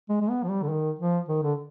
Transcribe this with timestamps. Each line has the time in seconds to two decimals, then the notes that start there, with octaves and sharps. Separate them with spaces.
0.09 G#3
0.21 G#3
0.30 B3
0.43 F3
0.49 G3
0.63 D3
0.70 D#3
0.99 F3
1.28 D#3
1.43 D3